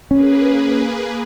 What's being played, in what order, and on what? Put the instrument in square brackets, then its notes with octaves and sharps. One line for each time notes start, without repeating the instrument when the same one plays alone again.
[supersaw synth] A#3 G#4 B4 [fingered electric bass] C#4